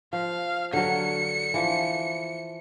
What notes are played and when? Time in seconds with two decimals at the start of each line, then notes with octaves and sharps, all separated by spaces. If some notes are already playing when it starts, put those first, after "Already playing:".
0.13 F3 F5
0.73 D3 F#3 C#7
1.54 E3 F3